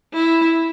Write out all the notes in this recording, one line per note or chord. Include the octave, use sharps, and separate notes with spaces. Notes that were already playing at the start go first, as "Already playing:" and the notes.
E4